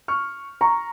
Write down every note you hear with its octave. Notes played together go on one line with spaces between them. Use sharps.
C#6 F6
A#5 C#6